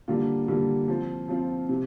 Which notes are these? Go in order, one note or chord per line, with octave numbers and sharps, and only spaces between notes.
D3 G3 A#3 F4
D3 G3 A#3 F4
F3 C4 F4
F3 C4 F4
C3